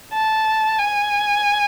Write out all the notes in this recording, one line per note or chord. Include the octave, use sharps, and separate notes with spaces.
A5
G#5